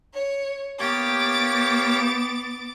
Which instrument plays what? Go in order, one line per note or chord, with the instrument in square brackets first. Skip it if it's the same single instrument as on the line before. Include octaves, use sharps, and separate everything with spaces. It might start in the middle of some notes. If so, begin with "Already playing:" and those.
[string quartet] C#5
[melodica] A#3 G4 C#5 [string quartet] B3 D6 A6